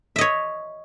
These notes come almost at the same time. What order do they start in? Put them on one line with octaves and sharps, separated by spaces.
E5 D#5 C#5